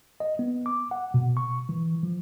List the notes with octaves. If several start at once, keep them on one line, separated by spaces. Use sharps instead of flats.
D#5
B3
D6
F#5
B2
C#6
E3
F3